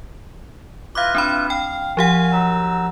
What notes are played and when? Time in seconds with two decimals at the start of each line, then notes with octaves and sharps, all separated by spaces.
0.95 E4 F4 B4 F5 D6
1.15 C4 D4 B5
1.50 F5 G5
1.97 F3 G4 F5 F#5 G#5
2.32 F#3 D#4 E6